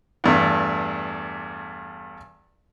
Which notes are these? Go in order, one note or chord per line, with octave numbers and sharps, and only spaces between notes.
E2 G2 A3